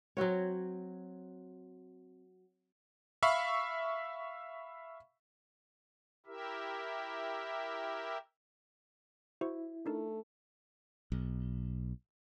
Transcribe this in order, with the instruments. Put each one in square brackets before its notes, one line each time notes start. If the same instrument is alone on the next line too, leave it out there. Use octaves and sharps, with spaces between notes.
[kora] F#3 C4 F#4 C#5
[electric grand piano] E5 F5 B5 C#6
[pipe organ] E4 G4 A#4 E5
[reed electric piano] E4 [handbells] F#4 C5 C#6
[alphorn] A3 [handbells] D4 D#4 A#4
[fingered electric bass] B1